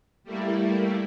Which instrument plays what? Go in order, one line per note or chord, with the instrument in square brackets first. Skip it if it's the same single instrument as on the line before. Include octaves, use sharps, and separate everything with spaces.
[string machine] G3 A3 A#3 E4